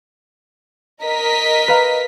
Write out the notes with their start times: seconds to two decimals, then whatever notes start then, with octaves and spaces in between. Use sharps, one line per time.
1.03 A#4 D#5 B6
1.68 B4 F5 A#5